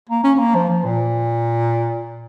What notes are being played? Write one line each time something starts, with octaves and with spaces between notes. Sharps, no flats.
A#3
C#4
C#4
A#3
F3
F3
A#2